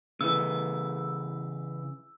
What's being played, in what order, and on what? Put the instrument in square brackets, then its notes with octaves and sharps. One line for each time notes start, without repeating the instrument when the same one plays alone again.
[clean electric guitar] C#3 E3 [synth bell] E6